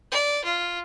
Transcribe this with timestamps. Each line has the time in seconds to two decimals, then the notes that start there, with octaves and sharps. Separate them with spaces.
0.12 D5
0.44 F4